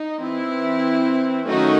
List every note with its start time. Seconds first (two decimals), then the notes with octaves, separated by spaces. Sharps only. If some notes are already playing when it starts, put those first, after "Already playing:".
Already playing: D#4
0.20 E3 C4 E4
1.47 D#3 F#3 A3 C#4 D#4 F#4